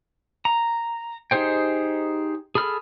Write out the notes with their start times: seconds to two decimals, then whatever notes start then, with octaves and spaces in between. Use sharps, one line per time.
0.45 A#5
1.31 D#4 G4 G#4 C5 G5
2.55 G#4 A4 B5 F6